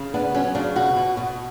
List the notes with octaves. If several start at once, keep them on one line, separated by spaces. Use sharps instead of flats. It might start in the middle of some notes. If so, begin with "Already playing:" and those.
Already playing: C#3
B3 D4
F#3 C#4
C#3 D4
B2 F#4
B2
B2